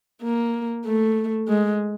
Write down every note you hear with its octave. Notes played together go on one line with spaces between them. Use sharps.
A#3
A3
G#3